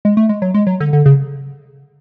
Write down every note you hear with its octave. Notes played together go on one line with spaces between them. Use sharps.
G#3
A3
G#3
F#3
G#3
F#3
D3
D3
C#3